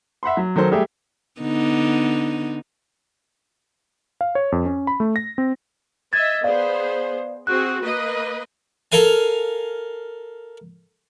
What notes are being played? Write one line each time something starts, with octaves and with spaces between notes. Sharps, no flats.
E5 F#5 B5 C6
F#3
D#3 F#3 A4 C5
G3 A3 G4 G#4 E5
D3 B3 D#4
F5
C#5
F2
C#4
B5
A3
A#6
C4
D#5 E5 G#6 A6
B3 G#4 C5 D5 F5
C4 F#4 G#4 F#6
A#3 B4 D#5
A4 A#4 F5 G#5